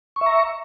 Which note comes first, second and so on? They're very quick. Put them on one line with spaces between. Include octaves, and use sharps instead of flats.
C#6 E5 A#5